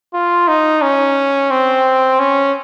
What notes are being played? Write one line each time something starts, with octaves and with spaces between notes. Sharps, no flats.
F4
D#4
C#4
C4
C#4